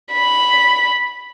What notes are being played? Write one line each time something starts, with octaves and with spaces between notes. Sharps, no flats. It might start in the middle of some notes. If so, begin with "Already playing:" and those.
B5